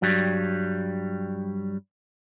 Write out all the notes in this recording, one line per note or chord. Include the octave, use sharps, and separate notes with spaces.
G2 F#3 G3